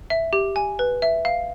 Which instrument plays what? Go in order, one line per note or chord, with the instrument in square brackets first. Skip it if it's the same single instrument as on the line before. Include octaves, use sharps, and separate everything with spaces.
[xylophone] E5
G4
G#5
B4
E5
F5